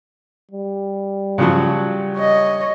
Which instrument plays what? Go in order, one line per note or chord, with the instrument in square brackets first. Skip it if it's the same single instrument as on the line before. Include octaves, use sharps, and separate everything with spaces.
[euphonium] G3
[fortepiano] C#3 F3 F#3
[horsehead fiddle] C#5 D#5